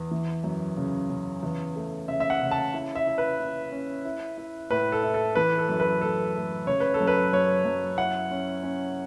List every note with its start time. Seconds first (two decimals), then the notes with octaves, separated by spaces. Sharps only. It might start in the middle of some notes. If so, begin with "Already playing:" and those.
Already playing: E2
0.11 E3
0.44 F#2
0.77 C#3
1.10 C#3
1.43 E2
1.76 A3
2.08 C#3 E5
2.20 E5
2.30 F#5
2.42 C#3
2.51 A5
2.74 E4
2.95 E5
3.07 E4
3.18 B4
3.39 E4
3.72 C#4
4.05 E4
4.38 E4
4.70 A2 B4
4.92 A4
5.03 E4
5.14 A4
5.35 E3 B4
5.58 A4
5.69 F#2
5.80 B4
6.01 A3 A4
6.35 A3
6.67 C#3 C#5
6.80 B4
6.94 A4
7.00 F#2
7.07 B4
7.33 F#2 C#5
7.65 F#2
7.98 E4 F#5
8.31 C#4
8.63 C#4